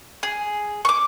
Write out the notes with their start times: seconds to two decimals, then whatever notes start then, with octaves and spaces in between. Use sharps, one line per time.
0.23 G#4
0.85 C#6 D6